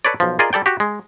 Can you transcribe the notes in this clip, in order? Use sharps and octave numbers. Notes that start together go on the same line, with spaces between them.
A4 B4 C#5 D5
B1 F3
F4 G#4 A#4 D5 D#5
G3 A4 D5 G5
F#4 G4
G#3